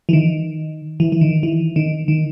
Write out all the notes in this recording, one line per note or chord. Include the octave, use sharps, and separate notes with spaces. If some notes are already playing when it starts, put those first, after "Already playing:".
E3
D#3
E3
E3
D#3
E3
D#3
D#3